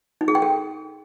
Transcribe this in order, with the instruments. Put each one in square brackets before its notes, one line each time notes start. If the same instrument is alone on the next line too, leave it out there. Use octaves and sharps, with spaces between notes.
[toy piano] D#4
G#4
G5
A4